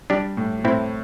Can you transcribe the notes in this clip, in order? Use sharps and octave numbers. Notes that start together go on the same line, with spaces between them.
G3 D4 G4
A2
A2 C4 E4